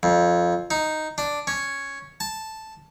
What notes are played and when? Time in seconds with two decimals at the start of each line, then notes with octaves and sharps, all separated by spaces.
0.03 F2
0.71 D#4
1.18 D4
1.47 C#4
2.20 A5